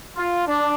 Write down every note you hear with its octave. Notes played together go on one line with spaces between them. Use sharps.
F4
D4